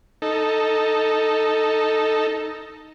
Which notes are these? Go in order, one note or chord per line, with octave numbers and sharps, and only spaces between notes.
D#4 A4